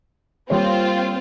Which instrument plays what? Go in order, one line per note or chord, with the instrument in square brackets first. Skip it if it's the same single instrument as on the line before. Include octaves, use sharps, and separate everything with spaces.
[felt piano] G3 A#3 C#5 [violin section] C4 F4